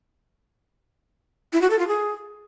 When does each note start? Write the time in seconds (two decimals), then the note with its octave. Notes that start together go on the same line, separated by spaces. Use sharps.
1.53 E4
1.62 F#4
1.70 A4
1.79 F4
1.88 G#4